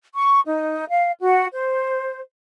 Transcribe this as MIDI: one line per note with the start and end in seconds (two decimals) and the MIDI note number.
0.13 0.41 85
0.45 0.84 63
0.89 1.11 77
1.21 1.46 66
1.53 2.20 72